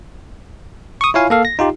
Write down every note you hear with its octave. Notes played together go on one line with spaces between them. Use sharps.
C#6 D#6
E4 F4 C#5 F5 G#5
A#3 A4 F5
A#6
D#4 F4 G4